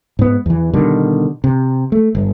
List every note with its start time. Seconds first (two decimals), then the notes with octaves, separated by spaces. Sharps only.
0.19 G#2 B3
0.46 E2 E3
0.73 B2 D3 D#3 G3
1.44 C3
1.92 A3
2.15 G1